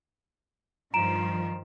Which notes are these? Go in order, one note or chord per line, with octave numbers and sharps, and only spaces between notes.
G2 D#3 F3 A#5 D7 E7